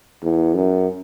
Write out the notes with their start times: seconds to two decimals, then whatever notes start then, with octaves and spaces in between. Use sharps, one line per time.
0.23 E2
0.54 F#2